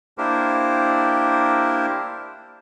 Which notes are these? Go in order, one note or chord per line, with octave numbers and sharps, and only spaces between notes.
A#3 D4 E4 G4 A#4 C5